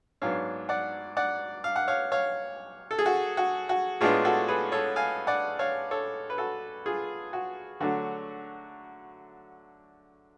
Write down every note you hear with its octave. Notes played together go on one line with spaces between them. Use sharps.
G#2 F#3 B3 D4 C#5 F5
D5 F#5
D5 F#5
F5
F#5
C#5 F5
C#5 F5
A4
G#4
F#4
F#4
F#4
A2 G#3 B3 D4 F4 G#4
F#4 A4
G#4 B4
A4 C#5
F5 G#5
D5 F#5
C#5 F5
A4 C#5
B4
F#4 A4
F4 G#4
F#4
D3 F#3 A3 D4 F#4